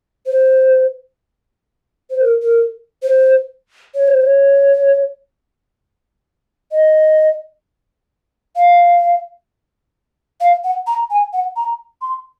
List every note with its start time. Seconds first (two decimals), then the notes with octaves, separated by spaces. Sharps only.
0.26 C5
2.10 C5
2.21 A#4
2.42 A#4
3.03 C5
3.95 C#5
4.08 C5
4.21 C#5
6.72 D#5
8.56 F5
10.41 F5
10.64 F#5
10.87 A#5
11.10 G#5
11.33 F#5
11.56 A#5
12.01 C6